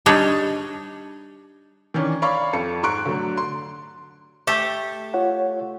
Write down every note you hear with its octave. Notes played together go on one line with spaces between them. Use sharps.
G3 D4 D#4 B4 C#5
D#3 E3 C#4 D4
C#5 D5 F5 B5 C#6
F2 C#7
G#2 A#5 C6 C#6 F#6 D7
D3 F#3 A3
C6
A3 G4 A4
F4 C#5 F#5